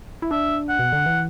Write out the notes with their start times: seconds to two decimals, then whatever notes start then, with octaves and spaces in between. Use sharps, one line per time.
0.22 E4
0.31 D4 E5
0.69 F#5
0.79 B2
0.92 D3
1.06 E3